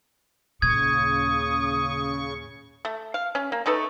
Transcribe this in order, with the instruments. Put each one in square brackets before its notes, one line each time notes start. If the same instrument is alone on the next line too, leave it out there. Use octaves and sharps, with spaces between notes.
[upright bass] D#2 A#2 [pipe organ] C#3 C#6 [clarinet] D#6 [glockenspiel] G#6
[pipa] A3
F5
C#4
A#3
A3 D#4 A4 B4